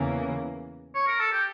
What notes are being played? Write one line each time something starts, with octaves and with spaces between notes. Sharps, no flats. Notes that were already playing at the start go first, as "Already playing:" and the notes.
Already playing: E2 C#3 E3 A#3 C#4
C#5
A#4
A4
G4